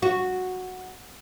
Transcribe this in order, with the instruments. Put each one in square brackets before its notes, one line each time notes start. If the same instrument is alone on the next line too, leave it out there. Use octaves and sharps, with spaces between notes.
[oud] F#4